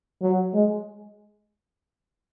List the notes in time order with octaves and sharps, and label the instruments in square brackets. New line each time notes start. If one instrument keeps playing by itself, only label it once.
[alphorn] F#3
G#3